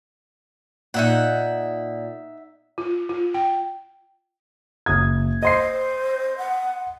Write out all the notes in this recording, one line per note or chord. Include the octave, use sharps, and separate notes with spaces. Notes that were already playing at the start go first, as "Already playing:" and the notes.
A#2 D#4 E5 F#5
F4
F4
G5
F#1 D#6 G#6
C5 D#5 C6 C7
F#5